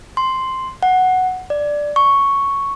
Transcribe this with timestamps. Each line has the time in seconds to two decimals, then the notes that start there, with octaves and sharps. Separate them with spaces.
0.17 C6
0.83 F#5
1.50 D5
1.96 C#6